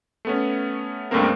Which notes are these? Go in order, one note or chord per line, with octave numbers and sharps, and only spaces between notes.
A3 B3 C#4
C#2 G2 A3 A#3 C4 A#4